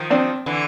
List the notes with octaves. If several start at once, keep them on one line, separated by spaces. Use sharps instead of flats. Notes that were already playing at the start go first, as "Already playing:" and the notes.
Already playing: D#3 F3
C4 D4
D3 E3